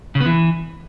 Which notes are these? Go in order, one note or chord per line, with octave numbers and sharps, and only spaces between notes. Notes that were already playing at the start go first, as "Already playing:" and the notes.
C#3
B3
E3